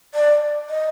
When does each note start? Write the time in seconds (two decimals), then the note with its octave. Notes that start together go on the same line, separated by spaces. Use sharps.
0.14 D5
0.69 D#5